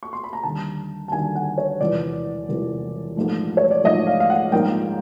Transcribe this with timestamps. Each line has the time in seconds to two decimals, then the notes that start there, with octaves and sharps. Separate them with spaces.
0.03 C#6
0.13 C6
0.23 B5
0.33 A#5
0.43 D#2 D3 G3 A5
1.08 A5
1.12 D#2 D3 G3 G#5
1.35 F#5
1.58 C#5
1.80 E1 E2 C3 F3 D5
2.49 E1 E2 C3 F3
3.17 A#1 G#2 F3 A3
3.57 C#5
3.71 D5
3.84 A#1 G#2 F3 A3 D#5
4.07 F5
4.20 F5
4.30 F#5
4.52 A#1 G#2 F3 A#3 G5